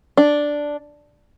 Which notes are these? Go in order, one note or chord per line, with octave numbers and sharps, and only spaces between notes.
D4